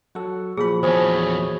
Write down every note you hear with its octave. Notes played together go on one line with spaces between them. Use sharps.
F#3 F#4 A4
A#2 F3 G#4 B5
E2 A3 G#4 C5 C#5 G#5